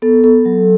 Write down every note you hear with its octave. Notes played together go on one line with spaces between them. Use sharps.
B3 A4
B3 A4
F#3